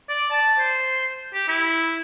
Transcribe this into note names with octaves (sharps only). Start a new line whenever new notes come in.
D5
A5
C5
G4
E4